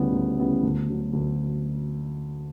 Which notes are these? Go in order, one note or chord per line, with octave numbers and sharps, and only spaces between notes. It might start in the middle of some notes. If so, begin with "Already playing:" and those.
Already playing: D2 C#3 G3 B3 E4
D2
C#3 G3 B3 E4
D2
D3 F#3
D2